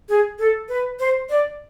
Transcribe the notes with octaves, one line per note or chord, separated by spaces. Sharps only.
G#4
A4
B4
C5
D5